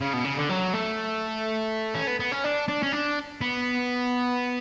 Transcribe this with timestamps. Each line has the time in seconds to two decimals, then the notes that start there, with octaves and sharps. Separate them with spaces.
0.01 C#3
0.13 B2
0.24 C#3
0.37 D3
0.49 F#3
0.74 A3
1.95 C#4
2.07 B3
2.20 B3
2.32 C#4
2.44 D4
2.68 D4
2.83 C#4
2.92 D4
3.41 B3